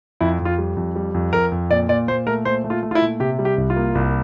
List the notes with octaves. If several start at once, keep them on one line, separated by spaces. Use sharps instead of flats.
F2 E4
F2
F4
G3
F2
G3
F2
F2 A#4
F2
A#2 D5
A#2 D5
A#2 C5
A3 A#4
A#2 C5
A3
F4
A3
F4
E4
A#2
C3 G4
G3
G4
C2
F4
A#3
C2